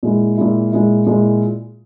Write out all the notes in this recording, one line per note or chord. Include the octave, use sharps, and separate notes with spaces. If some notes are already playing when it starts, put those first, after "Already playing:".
A#2 G#3 E4
A#2 G#3 E4
A#2 G#3 E4
A#2 G#3 E4